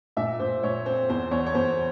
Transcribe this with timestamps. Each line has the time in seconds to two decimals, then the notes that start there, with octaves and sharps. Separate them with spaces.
0.17 A#2 E5
0.39 A#2 C5
0.63 A#2 C#5
0.86 C4 C5
1.09 E2 C5
1.31 E2 C#5
1.46 C#5
1.54 E2 C5